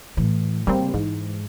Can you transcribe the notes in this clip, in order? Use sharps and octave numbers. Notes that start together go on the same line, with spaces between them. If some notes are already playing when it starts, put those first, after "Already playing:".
A2 E3
C#3 G3 A#3 C4
G#2 E3